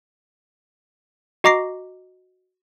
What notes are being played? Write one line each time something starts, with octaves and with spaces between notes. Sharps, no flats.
F#4 D#5 A#5 D6 A#6 C7